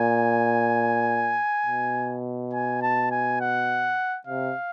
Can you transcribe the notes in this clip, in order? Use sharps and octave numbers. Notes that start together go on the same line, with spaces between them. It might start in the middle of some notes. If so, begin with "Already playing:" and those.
Already playing: A#2 G#5
B2
G#5
A5
G#5
F#5
C3 F5